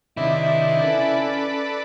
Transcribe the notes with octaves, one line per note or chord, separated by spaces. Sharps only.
C3 D#3 D4 E4 E5
C#4 A4 B4 D5